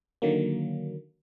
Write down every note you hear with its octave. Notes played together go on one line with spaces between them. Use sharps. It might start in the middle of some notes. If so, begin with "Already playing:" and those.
D3 D#3 F#3 A#3